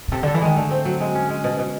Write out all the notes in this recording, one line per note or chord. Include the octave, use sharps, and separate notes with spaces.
B2
C3 A4
D3 A4
E3
D#3 G#3
D3 A3
C4
F#3
G#3
C#4
G#3
B2
B2